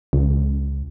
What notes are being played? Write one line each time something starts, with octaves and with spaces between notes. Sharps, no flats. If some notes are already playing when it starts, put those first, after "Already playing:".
C#2